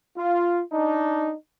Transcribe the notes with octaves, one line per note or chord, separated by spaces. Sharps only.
F4
D4 D#4